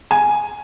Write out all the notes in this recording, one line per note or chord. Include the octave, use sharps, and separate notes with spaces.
G#5